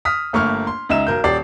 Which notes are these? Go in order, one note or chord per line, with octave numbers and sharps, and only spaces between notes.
D#6 F6 B6
G1 A3 A#3 C#6 F6
C6
C#2 D#4 E5 E7
B1 A#4 G6
D#1 G4 D5 C7